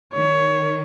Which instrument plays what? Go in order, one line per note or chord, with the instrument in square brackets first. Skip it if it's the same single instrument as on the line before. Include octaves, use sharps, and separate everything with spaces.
[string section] D#3 [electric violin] C#5